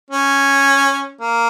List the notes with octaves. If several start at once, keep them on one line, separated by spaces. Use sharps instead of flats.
C#4
A#3